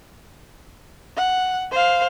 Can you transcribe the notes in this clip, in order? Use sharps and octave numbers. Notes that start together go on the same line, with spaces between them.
F#5
C5 F5